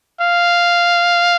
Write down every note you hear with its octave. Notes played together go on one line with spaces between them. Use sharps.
F5